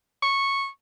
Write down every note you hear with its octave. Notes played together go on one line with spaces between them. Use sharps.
C#6